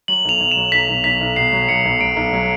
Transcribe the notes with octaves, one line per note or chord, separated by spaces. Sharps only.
F#3 F#7
B1 F7
B1
F#3 E7
B1 B6
B1
B1 B6
B1
B2 C7
F#3
B1 C#7
B1
F#3 D7
B1
F#3